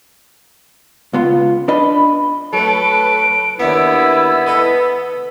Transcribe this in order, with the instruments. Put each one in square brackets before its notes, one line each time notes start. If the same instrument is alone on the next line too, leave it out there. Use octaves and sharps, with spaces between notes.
[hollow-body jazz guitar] C#2 B3 F4
[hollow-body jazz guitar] D4 B4 D#5 [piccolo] B5
[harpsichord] F#3 A3 [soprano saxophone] A4 [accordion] B4 [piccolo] D7
[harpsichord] D#2 D4 E5 [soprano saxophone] B3 [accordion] E4 [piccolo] E6
[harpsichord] A4 B4 D#5